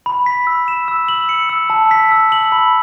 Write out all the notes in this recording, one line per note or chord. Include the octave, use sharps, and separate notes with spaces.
B5
B6
E6
E7
E6
F#7
C#7
E6
A5
B6
E6
F#7
B5